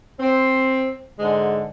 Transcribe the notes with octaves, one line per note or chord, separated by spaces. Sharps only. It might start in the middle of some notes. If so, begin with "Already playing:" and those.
C4
G#2 D3 G#3